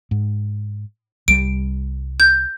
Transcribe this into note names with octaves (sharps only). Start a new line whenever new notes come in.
G#2
C2 G3 D7
G6